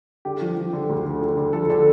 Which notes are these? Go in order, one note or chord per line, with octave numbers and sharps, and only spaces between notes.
D3 G4
F3
F3
D3
D2
D3
D3
D3
F3 A4
D3 A4